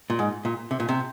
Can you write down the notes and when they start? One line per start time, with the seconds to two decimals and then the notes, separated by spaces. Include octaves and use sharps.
0.10 A#2
0.19 G#2
0.45 A#2
0.71 C3
0.80 A#2
0.89 C3